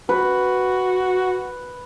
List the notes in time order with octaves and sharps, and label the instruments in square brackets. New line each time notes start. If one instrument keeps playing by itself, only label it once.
[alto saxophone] F#4 [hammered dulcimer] B4